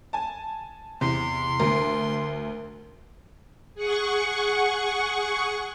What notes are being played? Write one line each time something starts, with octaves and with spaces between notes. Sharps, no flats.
G#5 A5
E2 C3 C6
D2 A#4
G#4 F#5 C#6